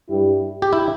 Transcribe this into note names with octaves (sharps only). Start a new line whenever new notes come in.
G2 G3 E4 G4
G4
E4